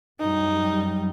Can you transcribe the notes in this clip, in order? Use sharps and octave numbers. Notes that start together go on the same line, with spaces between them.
F#2 F#3 G3 D#4